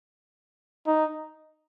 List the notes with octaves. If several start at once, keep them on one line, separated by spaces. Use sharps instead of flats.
D#4